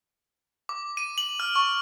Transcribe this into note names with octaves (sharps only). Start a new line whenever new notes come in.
D6
D#7
F#7
F6
C#6